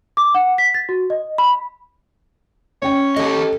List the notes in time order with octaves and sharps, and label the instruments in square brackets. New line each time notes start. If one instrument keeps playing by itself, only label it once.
[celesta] D6
F#5
B6
A6
F#4
D#5
B5
[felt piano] C#4 G5 [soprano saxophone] C#5
[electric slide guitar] G4 D#5 [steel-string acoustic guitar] A4